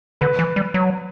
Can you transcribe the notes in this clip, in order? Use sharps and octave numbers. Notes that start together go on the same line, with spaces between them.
D3 B4
E3
G3
F#3